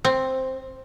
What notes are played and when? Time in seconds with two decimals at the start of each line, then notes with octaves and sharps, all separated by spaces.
0.05 C4